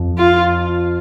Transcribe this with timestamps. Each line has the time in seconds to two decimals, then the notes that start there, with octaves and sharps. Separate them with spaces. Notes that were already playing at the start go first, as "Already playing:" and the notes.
Already playing: F2 F3
0.18 F4